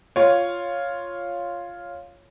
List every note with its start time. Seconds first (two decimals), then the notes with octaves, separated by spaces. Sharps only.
0.16 F4 C#5